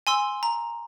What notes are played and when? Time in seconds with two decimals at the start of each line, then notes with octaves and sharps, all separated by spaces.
0.07 G#5 C6 E6
0.43 A#5